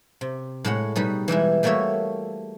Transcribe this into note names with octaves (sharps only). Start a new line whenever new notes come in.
C3
A2 G#3 C#5 F#5
B2 G3 D#4 B4
E3 G3 G#3 E4
G3 A3 A#3 F#4 C#5 E5